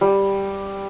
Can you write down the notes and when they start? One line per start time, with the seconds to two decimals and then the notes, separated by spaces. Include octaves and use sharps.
0.01 G3